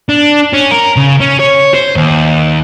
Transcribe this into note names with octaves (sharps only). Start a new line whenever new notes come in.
D4
C#4
A#4
C#3
C#4
C#5
C5
D#2